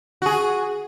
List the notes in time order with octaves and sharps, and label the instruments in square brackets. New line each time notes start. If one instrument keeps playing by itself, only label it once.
[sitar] F#4 G#4